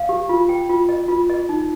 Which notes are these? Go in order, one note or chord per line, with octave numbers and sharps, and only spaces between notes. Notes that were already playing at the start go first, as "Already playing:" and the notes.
Already playing: F5
G4
F4
G5
F4
D#5
F4
D#5
D#4